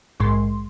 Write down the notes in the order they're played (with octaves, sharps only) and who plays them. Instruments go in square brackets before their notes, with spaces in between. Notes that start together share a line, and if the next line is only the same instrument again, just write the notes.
[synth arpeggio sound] A#1 G#2 G#3 C6